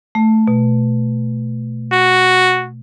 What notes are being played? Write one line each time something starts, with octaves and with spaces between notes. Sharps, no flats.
A3
B2
F#4